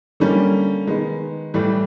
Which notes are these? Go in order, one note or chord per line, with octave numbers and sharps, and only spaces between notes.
D3 G3 A#3 C#4
D#3 G#3 B3
A2 E3 G3